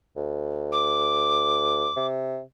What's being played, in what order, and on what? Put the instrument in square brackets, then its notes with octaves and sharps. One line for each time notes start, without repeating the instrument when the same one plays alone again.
[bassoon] D2
[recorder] D6
[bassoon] C3